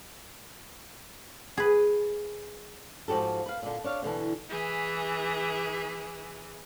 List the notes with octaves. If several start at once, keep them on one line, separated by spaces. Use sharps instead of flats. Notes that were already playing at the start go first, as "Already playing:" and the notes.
G#4 B4
G#2 F3 F#4 G4 A4
B4 F5
A#2 D3
D4 C#5 F5
B2 D3 E3 B3
E3 G#4